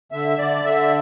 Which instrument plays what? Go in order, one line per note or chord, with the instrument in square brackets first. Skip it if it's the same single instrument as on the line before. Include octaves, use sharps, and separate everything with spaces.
[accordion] D3 E5
D3 D5
D3 E5